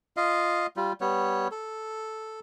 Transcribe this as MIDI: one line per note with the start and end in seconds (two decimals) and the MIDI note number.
0.17 0.67 65
0.17 0.67 75
0.17 0.67 77
0.76 0.93 55
0.76 0.93 65
1.01 1.48 55
1.01 1.48 59
1.01 1.48 73
1.51 2.40 69